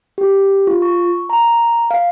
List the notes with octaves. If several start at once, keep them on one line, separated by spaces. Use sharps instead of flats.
G4
F4
C#6
A#5
F5